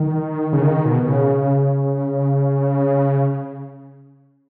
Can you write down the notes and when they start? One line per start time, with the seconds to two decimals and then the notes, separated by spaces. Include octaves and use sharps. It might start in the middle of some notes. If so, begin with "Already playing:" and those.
Already playing: D#3
0.53 C#3
0.62 D#3
0.85 B2
1.03 B2
1.08 C#3